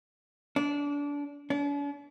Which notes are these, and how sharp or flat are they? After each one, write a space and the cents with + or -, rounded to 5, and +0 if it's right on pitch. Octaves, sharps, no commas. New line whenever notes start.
D4 -25
D4 -45